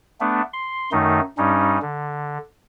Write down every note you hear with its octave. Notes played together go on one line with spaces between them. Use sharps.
A3 B3 D4
C6
F#2 D#3 A3 D#4
G2 G3 C#4 D#4
D3